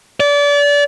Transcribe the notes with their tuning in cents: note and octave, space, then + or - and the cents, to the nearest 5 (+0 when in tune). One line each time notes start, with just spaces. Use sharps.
D5 -30